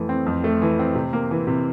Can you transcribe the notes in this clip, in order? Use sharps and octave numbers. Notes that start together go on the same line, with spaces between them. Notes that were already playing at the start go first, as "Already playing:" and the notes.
Already playing: F2 E3 A3
C4
F2
A3
E3
C4
C3
A#3
E3
C3